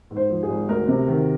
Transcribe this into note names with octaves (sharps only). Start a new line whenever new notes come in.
G#2
C5
F3
G#4
G#1
D2 A#4
C3
D#3